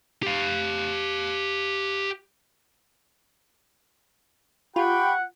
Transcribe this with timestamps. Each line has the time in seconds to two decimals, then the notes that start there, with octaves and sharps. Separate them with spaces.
0.23 G4 F5
4.76 F4 G4 F#5 G5 B5 C#6